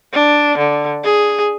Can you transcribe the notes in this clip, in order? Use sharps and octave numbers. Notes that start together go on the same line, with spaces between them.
D4
D3
G#4